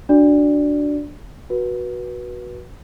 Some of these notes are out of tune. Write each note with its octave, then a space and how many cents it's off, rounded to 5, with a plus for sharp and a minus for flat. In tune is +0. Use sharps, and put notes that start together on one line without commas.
D4 +0 F#4 +0 D5 +0
F#4 +0 B4 -25